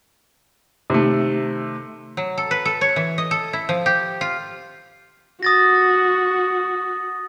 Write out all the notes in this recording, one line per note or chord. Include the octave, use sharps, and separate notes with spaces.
C3 D#3 A3
F#3
A4
B4
A4
C#5
E3
D#5
A4
E4
F3
G4
F4
F#4 D#6 A6 A#6